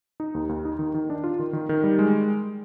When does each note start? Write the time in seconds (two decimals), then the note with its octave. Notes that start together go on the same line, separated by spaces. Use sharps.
0.20 D#4
0.34 D#2
0.49 D#2
0.65 D#4
0.79 D#3
0.94 D#3
1.10 D4
1.24 F4
1.39 D#3
1.53 D#3
1.69 D#3
1.84 G3
1.99 G#3